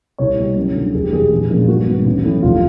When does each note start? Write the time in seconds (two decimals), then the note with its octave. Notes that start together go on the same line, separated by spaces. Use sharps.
0.18 C2 C#5
0.38 B2 G3
0.56 F#2
0.75 D3 F#3
0.94 F1 G#4
1.04 G4
1.13 E2 B2 G#4
1.31 A#1
1.49 A#2 F3 G#3 C#4
1.68 G2 F#4
1.87 D#3 G3 B3
2.05 A1
2.25 A2 F#3
2.43 F1 F4